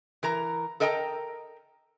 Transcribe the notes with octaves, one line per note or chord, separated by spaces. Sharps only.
E3 A#4 A#5
A4 A#4 D#5 G5 A5 A#5